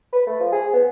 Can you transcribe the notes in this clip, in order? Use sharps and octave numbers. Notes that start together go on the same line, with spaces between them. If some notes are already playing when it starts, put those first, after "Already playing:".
B4
A3
F3
G#4
B3